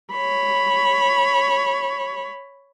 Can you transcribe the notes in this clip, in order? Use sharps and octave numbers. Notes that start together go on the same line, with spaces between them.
C#5 B5